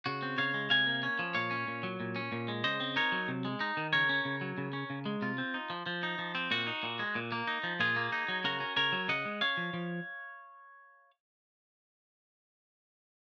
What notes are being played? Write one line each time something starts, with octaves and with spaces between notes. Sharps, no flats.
C#3 F#4
C4
C#3 C#5 F5
G#3
C3 F5 G#5
A#3
C#4
F3
A#2 C#5 F5
C#4
A#2
F#3
A#2
C#4
A#2
G#3
C#3 C5 D#5
C4
D#4 A#4 C#5
F#3
C3
G#3
D#4
D#3
C#3 A#4 C#5
C#4
C#3
F#3
C#3
C#4
C#3
G#3
C3 F4
C4
D#4
F3
F3
D#4
F3
C4
A#2 F#4
D#4
A#2
G#3
A#2
A#3
D#4
F3
A#2 F4 G#4
A#3
D#4
F#3
C#3 F#4 A#4
C#4
C#3 A#4 C#5
F#3
C#3 D#5 F#5
G#3
C#4 C#5 F5
F3
F3